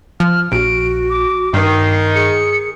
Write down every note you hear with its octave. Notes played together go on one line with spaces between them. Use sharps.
F3 F6
A#1 F#4 D7
D6
G2 D#3 C7
G#4 C#7